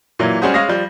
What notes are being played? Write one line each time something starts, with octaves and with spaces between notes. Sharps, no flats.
A#2 E3 F#3 A#3
G3 G#3 C#4 F#4 G#4 C5
G#3 C#5 F5 D#6 A#6
F3 G3